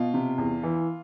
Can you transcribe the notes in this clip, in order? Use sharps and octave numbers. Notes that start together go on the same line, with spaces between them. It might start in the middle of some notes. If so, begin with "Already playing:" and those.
Already playing: B2 F4
C3
E2
E3